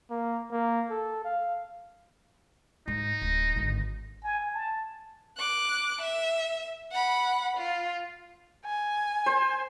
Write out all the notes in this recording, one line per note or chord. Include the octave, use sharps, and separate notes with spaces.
A#3
A#3
A4
F5
G#2 D#4
D1
G#1 D3
G#5
A5
D6 F#6
E5
F#5 B5
F4
G#5
C5